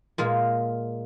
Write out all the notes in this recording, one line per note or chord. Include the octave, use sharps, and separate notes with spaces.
A#2 G#3 A#3